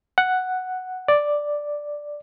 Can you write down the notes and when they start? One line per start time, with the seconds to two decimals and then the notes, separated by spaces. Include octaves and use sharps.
0.18 F#5
1.08 D5